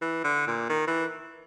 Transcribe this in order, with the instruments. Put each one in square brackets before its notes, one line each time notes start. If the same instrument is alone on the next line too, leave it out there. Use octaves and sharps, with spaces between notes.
[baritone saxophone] E3
D3
A#2
D#3
E3